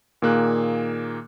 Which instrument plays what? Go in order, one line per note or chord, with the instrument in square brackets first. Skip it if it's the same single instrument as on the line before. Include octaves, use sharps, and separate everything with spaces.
[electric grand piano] A#2 D#3 A#3 G#4 F#6